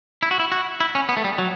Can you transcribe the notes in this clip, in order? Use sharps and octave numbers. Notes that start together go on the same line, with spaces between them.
E4
F#4
E4
F#4
E4
C#4
B3
A3
G3
F#3